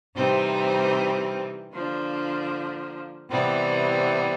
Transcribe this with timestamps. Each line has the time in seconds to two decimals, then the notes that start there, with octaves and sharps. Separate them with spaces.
0.15 C3 E3 G3 C4 D#4
1.73 D3 F3 A#3 D4
3.30 C3 E3 G3 B3